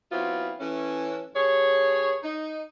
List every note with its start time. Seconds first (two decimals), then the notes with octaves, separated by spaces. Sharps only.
0.12 F#3 B3 C4 E4 F4
0.60 E3 A3 C#4
1.35 G2 G#4 C#5
2.23 D#4